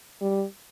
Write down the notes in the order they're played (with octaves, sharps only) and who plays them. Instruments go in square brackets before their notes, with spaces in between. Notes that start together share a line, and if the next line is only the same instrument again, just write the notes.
[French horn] G3